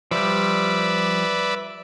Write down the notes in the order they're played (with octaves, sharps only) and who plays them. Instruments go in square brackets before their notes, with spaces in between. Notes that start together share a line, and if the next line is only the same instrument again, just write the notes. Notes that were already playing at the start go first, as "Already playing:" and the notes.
[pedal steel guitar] F3 G3 [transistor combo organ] B4 D5 E5